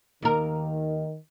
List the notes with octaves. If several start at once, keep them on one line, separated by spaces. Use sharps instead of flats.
D#2 D#3 A#4